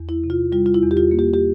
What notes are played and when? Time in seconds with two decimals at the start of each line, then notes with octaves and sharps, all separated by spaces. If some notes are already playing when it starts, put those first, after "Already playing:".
Already playing: E2
0.09 E4
0.24 C3
0.30 F4
0.52 G3 F4
0.66 F4
0.74 E4
0.82 E2
0.91 G4
0.97 F4
1.11 A#3
1.19 G4
1.34 G4